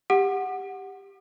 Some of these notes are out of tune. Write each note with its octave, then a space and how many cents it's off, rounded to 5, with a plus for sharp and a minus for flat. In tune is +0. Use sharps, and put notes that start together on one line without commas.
G4 +10 F#5 +0 D6 +45